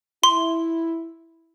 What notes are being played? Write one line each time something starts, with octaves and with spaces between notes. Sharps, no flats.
E4 C6